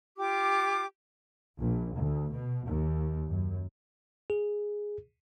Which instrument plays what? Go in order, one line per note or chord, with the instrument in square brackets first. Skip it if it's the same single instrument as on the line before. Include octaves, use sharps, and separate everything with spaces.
[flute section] F4 G4 D6
[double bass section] A#1
D2
B2
D#2
F#2
[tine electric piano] G#4